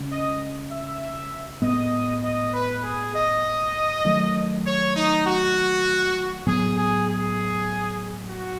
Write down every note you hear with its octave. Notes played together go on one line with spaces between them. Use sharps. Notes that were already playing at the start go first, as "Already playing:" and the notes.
Already playing: C#3 G#3 C#4
D#5
E5
A2 G#3 B3 D#5
D#5
B4
G#4
D#5
D#3 F#3 A3
C#5
D#4
F#4
A2 F#3 B3 G#4
G#4
G#4
F#4